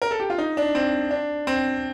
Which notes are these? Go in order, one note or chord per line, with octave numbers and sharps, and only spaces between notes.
A#4
A4
G4
F4
D#4
D4
C4
D4
C4